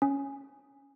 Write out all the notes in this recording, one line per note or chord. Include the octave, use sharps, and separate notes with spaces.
C#4